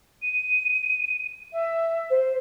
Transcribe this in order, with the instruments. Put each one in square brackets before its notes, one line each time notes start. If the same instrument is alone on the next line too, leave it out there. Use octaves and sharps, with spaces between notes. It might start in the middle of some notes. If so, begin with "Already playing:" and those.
[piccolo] D#7
E5
[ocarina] C5